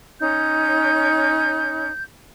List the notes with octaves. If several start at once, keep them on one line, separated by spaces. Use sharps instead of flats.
C#4 D#4 C#5 G6